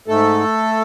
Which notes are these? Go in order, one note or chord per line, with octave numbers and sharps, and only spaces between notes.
G#2 A3 A4